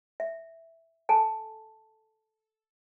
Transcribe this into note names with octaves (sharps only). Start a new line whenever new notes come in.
E5
A4 G#5 A5